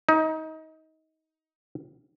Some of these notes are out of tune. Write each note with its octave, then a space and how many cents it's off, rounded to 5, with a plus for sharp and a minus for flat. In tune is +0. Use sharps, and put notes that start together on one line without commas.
D#4 +25